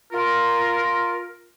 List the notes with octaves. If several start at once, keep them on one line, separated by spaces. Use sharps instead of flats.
F4 A#4